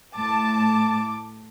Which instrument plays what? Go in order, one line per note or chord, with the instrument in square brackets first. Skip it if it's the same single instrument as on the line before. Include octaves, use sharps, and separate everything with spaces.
[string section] A2 A5 [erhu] D6